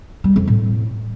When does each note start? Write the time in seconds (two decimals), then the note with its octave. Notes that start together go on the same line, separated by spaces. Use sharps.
0.24 G3
0.36 F2
0.47 A2